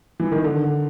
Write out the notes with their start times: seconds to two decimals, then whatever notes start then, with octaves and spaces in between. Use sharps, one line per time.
0.20 E3
0.32 D#3
0.44 D3